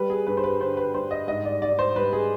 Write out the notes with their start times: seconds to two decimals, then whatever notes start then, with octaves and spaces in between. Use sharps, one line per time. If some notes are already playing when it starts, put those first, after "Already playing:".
Already playing: G3 B4
0.10 G#4
0.26 G2 B4
0.37 C5
0.44 B4
0.60 D3 C5
0.77 B4
0.94 G2 C5
1.11 D#5
1.28 G#2 D#5
1.45 D5
1.62 G#2 D5
1.79 C5
1.95 G3 B4
2.13 G#4